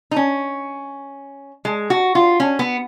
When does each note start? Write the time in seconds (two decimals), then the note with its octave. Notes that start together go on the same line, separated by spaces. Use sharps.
0.11 D#4
0.16 C#4
1.65 G#3
1.90 F#4
2.15 F4
2.40 C#4
2.59 B3